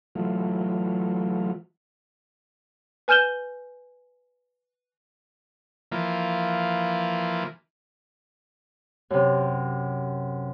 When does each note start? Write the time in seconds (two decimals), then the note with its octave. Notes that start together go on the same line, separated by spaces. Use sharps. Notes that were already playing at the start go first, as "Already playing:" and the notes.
0.15 E3 F#3 A3 F4
3.08 B4 G#5 F6 G6 E7 G7
5.92 E3 F3 A#3
9.10 F#2 C3